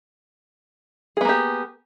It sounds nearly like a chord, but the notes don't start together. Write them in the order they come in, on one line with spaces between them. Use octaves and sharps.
G#4 B3 A#3 G4